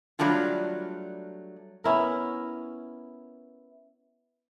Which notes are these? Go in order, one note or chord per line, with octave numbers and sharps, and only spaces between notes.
F#3 G3 A3 D4 F4
B3 C#4 E4 A#4